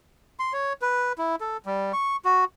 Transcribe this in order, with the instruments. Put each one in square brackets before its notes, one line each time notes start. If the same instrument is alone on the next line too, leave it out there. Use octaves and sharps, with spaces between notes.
[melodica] C6
C#5
B4
E4
A4
G3
C#6
F#4